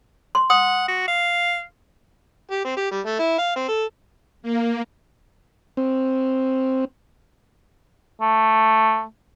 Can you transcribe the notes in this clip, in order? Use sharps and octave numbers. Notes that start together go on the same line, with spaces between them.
C6
F#5 D#6
F#4
F5
G4
C4
G4
G3
A3
E4
F5
C4
A4
A#3
C4
A3